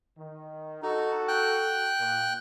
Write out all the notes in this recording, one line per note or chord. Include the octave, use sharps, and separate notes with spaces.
D#3
D#4 F#4 A4
G5 F#6
A#2